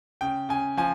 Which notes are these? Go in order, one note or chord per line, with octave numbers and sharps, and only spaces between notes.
C#3 G5
C#3 G#5
F3 G#5